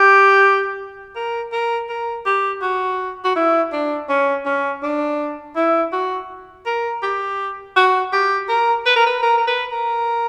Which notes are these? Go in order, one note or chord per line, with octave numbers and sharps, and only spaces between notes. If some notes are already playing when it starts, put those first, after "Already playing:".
Already playing: G4
A#4
A#4
A#4
G4
F#4
F#4
E4
D4
C#4
C#4
D4
E4
F#4
A#4
G4
F#4
G4
A#4
B4
A#4
B4
A#4
A#4
B4
A#4